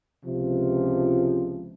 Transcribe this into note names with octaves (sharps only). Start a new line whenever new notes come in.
C#2 C3 F3